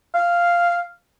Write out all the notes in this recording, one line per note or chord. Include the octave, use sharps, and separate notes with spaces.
F5